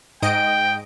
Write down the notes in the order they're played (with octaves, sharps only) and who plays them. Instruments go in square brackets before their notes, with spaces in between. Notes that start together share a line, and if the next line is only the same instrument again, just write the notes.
[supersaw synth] G#2 D#5 D7 [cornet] G5